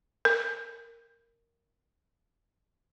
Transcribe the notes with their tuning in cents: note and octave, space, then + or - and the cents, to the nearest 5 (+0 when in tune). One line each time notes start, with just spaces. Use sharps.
A#4 -5